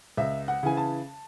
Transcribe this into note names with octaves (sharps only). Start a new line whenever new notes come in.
C#2 E5
F#5
C#3 E3 G#5
A5